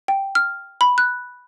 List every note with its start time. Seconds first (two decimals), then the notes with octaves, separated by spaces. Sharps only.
0.08 G5
0.35 F6
0.81 B5
0.98 F#6